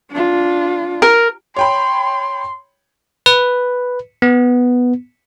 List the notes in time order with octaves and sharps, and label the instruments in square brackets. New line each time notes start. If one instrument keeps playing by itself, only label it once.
[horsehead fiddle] D4 F4
[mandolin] A#4
[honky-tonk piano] C#5 G5 B5 [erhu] C6
[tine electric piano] B4
B3